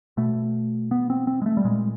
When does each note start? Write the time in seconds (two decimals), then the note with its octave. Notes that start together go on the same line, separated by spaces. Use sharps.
0.17 B2 A3
0.91 B3
1.10 C4
1.27 C4
1.42 G#3
1.46 A3
1.57 G3
1.64 A#2 G#3